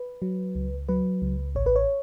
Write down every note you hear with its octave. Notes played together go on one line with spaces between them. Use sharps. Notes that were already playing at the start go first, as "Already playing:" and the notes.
Already playing: B4
F#3
C#2
F#3 B4
C#2
A1 C#5
B4
C#5